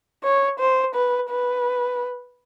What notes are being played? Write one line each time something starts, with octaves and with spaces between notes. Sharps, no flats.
C#5
C5
B4
B4